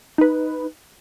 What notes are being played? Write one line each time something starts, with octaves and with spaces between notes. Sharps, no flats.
D#4 B4